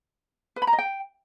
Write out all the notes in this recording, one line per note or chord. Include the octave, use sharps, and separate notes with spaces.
B4
B5
A#5
D#5
G5